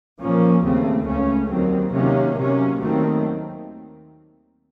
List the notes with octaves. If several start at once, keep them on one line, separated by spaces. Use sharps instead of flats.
A#2 F3 A#3 C#4
D#2 C#3 A3 C4
C#2 C#3 A3 C#4
D#2 D#3 F#3 C4
C3 D#3 F#3 A#3 C#4
C3 F#3 A#3 C#4
D#2 D#3 F#3 A3 C4